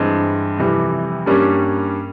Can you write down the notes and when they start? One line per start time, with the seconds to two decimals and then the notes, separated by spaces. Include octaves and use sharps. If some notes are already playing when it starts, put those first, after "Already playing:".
Already playing: G2 E3 G#3 C4
0.58 F2 C3 E3 G3
1.26 G2 G3 A#3 C#4